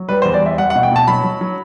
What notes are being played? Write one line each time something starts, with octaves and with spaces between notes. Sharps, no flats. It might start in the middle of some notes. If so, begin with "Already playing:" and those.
Already playing: F#3
G3 B4
E2 C5
D5
G3 E5
G3 F#5
F#5
B2
G5
B2 A5
F#3 B5
F#3
F#3